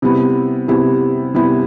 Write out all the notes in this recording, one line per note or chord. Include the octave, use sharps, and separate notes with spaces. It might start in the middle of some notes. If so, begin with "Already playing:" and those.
C3 G3 B3 E4
C3 G3 B3 E4
C3 G3 B3 E4